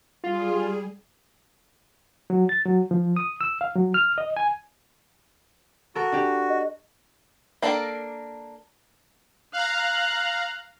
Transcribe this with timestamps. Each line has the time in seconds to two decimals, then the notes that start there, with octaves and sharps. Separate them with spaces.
0.24 G3 F4 G#4
2.30 F#3
2.49 A6
2.66 F#3
2.91 F3
3.16 D#6
3.41 E6
3.61 F5
3.76 F#3
3.94 F6
4.18 D#5
4.37 G#5
5.95 F#4 A4 A#4
6.12 D4 G4
6.50 D#5
7.62 A#3 D4 A4 A#4
9.53 F5 A#5 F#6